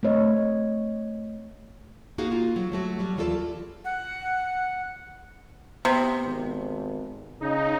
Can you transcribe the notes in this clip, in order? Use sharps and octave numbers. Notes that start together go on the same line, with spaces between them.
A3 C4 C#5 D#5
A#3 D#4 F#4 G#4 F5
A#3 F4
F#3
F#3 A3 F#4
F#3 G3
D#2 E3 F4 G#4 A4 D5
F#5
C3 B3
G#1
C#3 D#4